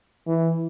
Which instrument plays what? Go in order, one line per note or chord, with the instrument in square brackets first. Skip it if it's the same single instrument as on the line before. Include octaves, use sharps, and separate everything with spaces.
[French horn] E3